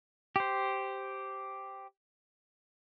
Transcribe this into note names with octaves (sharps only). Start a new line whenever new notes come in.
G4 C5